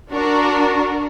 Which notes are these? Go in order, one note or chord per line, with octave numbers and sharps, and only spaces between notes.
D4 F#4 A#4